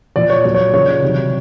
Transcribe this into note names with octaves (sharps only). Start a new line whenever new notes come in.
A#2 F3 D5
C#5
A#2 F#3 D5
C#5
C#3 F3 C#5
C3 D#3 F#3